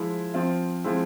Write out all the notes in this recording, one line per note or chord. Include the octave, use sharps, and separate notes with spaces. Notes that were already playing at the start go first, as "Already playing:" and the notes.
Already playing: F3 G#3 E4
F3 C4 F4
F3 G#3 C4 E4